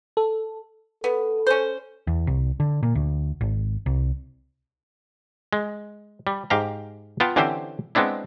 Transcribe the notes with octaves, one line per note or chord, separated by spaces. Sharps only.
A4
B3 A4
C#4 C5
E2
C2
D3
A#2
D2
G#1
C2
G#3
G3
G#2 G4 F5 A#5
B3 F4 G5 A5
D3 E3 C4 C#4 G4 C5
G#3 B3 C4 D4 E4